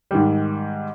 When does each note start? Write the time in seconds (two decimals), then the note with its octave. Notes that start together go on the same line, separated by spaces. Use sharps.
0.11 G#2 D#3 G3